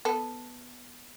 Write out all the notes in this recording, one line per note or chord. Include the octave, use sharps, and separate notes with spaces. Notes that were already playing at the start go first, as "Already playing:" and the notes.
B3 A4